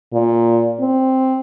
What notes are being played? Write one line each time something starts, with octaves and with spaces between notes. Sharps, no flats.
A#2
C4